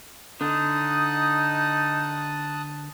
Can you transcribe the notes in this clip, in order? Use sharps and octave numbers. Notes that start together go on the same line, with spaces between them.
D3 D#4 A5 D#6 F#6